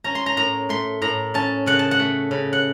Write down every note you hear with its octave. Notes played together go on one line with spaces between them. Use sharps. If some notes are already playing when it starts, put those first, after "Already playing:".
C#4 A#5
C6
A#5
A2 A#5
A3 C6
A2 A#5
C#4 A5
C#3 F#5
A5
F#5
A3
C#3
F#5